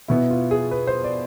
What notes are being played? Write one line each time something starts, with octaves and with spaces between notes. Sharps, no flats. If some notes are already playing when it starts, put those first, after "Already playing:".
B2 B3 E4
F4
G#4
B4
C5
D5